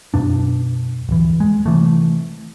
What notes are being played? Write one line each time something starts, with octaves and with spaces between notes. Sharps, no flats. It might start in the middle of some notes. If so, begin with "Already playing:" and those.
F#2 B2 D4
D1 E3
G#3
C3 E3 A3